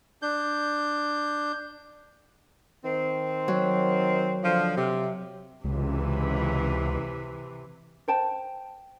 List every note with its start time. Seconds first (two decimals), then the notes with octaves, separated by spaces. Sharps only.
0.22 D4 G6
2.85 D#3 C4
3.48 F#3
4.44 D3 F3
4.77 C3
5.64 C#2 C3 E3
8.08 C5 G5 A5